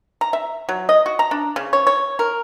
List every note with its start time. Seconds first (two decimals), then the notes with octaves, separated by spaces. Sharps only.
0.21 A#5
0.33 E5
0.69 F#3
0.89 D#5
1.06 F#4
1.19 A#5
1.31 D4
1.56 C#3
1.73 C#5
1.87 C#5
2.19 A#4